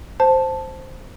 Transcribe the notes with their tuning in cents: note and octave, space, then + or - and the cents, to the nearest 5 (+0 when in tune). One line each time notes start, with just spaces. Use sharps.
C5 +0 A5 +0